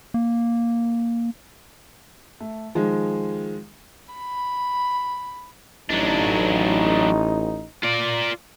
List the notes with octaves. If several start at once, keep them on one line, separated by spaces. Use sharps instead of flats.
A#3
A3
D#3 F3 G#3
B5
A1 F#3 D4 D#4
F4 D5